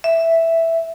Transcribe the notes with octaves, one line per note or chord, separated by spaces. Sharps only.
E5